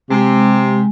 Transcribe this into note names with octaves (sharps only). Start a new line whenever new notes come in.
C3 G#3